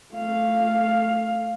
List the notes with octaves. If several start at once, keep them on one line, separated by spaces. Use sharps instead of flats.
A3 F5